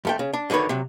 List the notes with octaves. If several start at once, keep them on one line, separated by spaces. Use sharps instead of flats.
F2 A3 G5
C#3
D4
F#2 D3 D#3 B4 C#5
C3 F#3